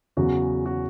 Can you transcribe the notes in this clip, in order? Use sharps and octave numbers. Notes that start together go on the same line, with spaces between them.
E2 C#3 F#3 F#4
F#4